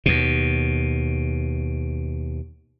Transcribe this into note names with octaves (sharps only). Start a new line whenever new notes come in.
D#2 B2